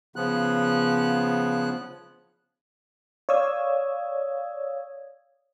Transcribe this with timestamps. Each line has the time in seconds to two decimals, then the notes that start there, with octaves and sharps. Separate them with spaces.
0.16 C#3 F3 B3 F#6
3.29 C#5 D5 F5 D#6 E6 G#6